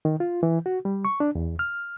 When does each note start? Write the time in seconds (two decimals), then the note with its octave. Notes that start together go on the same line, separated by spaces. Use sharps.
0.05 D#3
0.20 F4
0.43 E3
0.66 F#4
0.85 G3
1.05 C#6
1.20 D4
1.35 E2
1.59 F6